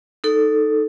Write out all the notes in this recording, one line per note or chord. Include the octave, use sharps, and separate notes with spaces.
D#4 A4